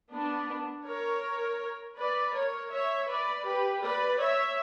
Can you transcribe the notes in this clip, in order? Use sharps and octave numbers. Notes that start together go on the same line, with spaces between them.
B3 D4
A#4 C#5
B4 D5
A#4 C#5
C#5 E5
B4 D5
G4 B4
B4 D5
C#5 E5